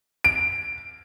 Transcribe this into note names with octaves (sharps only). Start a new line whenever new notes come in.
D7